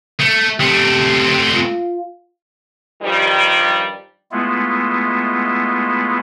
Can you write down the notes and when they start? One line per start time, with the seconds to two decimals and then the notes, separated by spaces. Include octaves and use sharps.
0.19 A3
0.60 A3 C4 G4
1.55 F4
3.02 G2 D#3 F3 G3
4.32 G#3 A3 B3 E4 F4